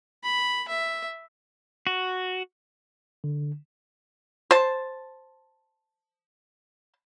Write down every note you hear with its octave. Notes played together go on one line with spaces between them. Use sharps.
B5
E5
F#4
D3
C5 A5